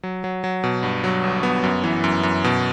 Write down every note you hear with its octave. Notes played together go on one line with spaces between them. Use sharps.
F#3
F#3
F#3
B2
G2
F#3
G1
B3
F#2
E3
F#2
F#2
B2